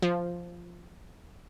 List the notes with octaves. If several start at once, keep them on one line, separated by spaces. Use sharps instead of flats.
F3